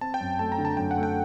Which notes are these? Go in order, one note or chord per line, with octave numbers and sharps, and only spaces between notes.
C4 A5
G5
F#2
A3 A5
A#5
D3
A5
F#2 G5
F#5
A3
G5